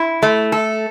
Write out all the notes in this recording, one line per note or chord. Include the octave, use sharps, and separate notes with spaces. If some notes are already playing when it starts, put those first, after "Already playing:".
Already playing: E4
A3
A4